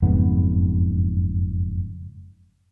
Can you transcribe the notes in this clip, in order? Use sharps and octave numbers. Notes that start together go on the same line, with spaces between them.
F#1 F2 G#2 B3